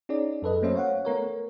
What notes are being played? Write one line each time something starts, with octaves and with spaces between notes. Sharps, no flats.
C#4 D#4 G#4 D5
F#2 A4 B4 D#5
F#3 A3 A#3 C#4 C5 E5
C#5 F5 F#5
A3 B3 A#4 C#5